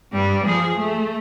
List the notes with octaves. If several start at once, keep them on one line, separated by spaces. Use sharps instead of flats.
G2 G3
F3 G#4
A3